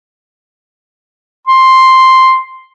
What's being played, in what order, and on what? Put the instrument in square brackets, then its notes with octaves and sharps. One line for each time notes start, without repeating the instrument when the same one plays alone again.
[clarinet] C6